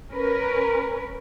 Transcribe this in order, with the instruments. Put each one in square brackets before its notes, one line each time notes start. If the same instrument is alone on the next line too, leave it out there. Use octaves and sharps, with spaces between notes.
[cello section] C#4 A#4 B4